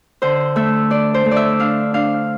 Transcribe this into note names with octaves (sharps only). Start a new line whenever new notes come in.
D3 C5
A3 E5
D4 D5
C5
A3
D5 E5
D4 F5
D4 F5